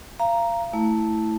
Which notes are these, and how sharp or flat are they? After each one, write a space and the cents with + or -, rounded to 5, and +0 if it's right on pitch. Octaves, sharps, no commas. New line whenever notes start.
F5 -25 A#5 +0
A3 +0 E4 -10